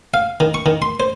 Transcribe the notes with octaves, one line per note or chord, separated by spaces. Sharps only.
F5
D#3
C#6
D#3
C6
C5